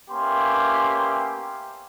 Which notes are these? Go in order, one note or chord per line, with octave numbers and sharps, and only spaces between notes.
A#3 B3 C#4 G4 E5 C6